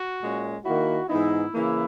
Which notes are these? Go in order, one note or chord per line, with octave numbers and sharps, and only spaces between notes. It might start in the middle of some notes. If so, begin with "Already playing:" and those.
Already playing: F#4
A#2 G#3 C#4
D#3 A#3 E4 F#4
G#2 E3 B3 D#4 E4
C#3 E3 A#3 E4